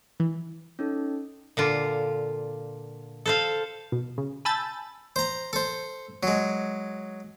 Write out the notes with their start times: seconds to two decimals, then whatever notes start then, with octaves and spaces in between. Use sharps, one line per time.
0.20 E3
0.79 C#4 D#4 A4
1.57 A#2 D3 F4
3.26 A4 C5 F5
3.92 B2
4.18 C#3
4.45 G#5 A5 B5 E6 G6 A6
5.16 C5 A#5
5.53 A4 C5
6.23 F#3 G#3